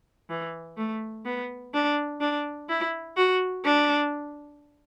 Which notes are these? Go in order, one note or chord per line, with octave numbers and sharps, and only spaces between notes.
E3
A3
B3
D4
D4
E4
F#4
D4